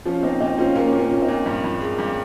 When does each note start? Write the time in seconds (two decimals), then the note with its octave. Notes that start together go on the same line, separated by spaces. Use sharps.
0.05 F3 C#4 F4
0.22 A#2 C4 D#4
0.41 A#2 C4 D#4
0.58 C4 C#4 F4
0.75 A#2 A#3 C#4
0.93 A#2
0.99 A#3 C#4
1.11 A#2
1.22 C4 D#4
1.29 A#2
1.46 G2
1.64 G2
1.81 G#3
1.99 G2